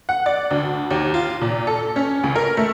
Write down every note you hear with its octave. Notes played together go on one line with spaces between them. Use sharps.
F#5
D5
D2
D#2
F4
A#2
A4
C#4
C#2
A#4
A3